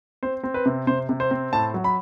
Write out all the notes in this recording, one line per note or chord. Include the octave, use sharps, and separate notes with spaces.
C4 C5
C4
B4
C3
C3 C5
C3
C5
C4
A2 A5
F#3
B5